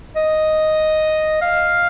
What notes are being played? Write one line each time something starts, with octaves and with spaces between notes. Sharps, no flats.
D#5
F5